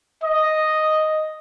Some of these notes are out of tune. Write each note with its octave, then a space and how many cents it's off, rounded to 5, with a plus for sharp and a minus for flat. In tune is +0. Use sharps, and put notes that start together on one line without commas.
D#5 +0